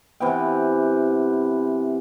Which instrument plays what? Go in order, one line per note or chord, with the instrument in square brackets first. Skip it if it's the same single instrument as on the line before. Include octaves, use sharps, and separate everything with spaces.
[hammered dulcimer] C3 E3 B3 G5